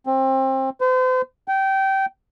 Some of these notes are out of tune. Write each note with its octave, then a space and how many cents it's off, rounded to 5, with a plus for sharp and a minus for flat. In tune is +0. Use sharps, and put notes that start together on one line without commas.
C4 +25
C5 -40
G5 -20